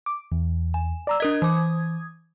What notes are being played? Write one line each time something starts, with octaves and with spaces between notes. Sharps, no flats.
D6
E2
G#5
D5 A#5 E6
D4 A#4 D#5 D#6 G#6
E3 D6